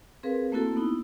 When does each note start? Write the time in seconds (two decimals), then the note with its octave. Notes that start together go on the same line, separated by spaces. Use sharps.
0.23 C4 G#4 A#4 B4 F5
0.52 A3 A#3 C4 E4 F#4 A4
0.76 B3 D#4 E4